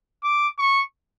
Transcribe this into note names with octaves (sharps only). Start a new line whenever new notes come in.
D6
C#6